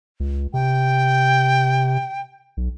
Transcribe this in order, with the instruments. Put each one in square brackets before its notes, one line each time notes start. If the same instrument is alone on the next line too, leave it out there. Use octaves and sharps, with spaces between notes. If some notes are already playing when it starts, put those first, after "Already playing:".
[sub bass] C#2
[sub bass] C3 [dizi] G5
[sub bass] B1